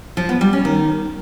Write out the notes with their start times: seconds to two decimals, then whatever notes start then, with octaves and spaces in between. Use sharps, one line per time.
0.17 F3
0.29 B3
0.41 G3
0.53 C#4
0.65 D#3